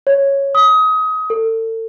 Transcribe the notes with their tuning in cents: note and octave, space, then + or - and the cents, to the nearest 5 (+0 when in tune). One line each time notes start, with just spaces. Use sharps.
C#5 -5
D#6 +25
A4 +35